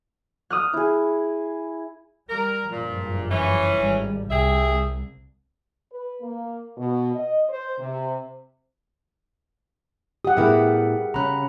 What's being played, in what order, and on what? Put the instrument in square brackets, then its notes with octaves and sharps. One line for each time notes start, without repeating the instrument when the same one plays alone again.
[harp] D#6 F6 F#6
[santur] E4 G#4
[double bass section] G3 [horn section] A#4
[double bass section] F#1 G2 F3 [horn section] A#2
[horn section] E3 C#4
[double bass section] G#1 G3
[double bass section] C2 [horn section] G4 G#4 E5
[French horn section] B4
A#3
B2
D#5
C5
C3
[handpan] G4 F#5 [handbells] D#6
[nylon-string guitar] A2 B3 E4 [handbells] G#4 A#4 E5
[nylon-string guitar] C#3 C#4 [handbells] A#5 B5 F#6